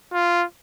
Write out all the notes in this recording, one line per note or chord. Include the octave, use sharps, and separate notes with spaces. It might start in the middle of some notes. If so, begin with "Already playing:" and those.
F4